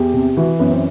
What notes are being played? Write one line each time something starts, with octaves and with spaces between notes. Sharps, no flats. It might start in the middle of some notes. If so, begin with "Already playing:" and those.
Already playing: E2 G4
C3
E3 F#4
F#2 B3
C4